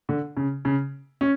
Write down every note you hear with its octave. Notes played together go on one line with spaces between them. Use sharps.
D3
C#3
C#3
C#4